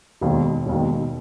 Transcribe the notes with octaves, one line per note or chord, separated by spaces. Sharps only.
E1 D#2 D#3
E1 D#2 D#3